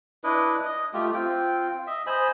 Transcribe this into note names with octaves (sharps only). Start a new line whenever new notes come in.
D4 E4 B4 D#5
D#5
A3 F4 G4
C4 F4 G5
D#5 E5
C5 D#5 G#5 B5